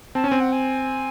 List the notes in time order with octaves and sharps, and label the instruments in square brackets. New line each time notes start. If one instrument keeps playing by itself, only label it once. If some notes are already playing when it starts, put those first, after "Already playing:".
[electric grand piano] C4 [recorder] A5
[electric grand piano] C#4
[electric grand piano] C4 [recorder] G#5
[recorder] F#5
G#5